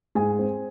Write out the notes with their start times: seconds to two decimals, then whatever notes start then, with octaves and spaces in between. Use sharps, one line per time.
0.15 G#2 G#4 G#5
0.39 C4